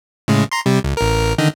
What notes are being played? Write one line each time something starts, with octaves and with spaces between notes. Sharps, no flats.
A2 C#3 G#3
A#5 C6
C3 G3
C#2
A1 A#4
D3 D#3 D#4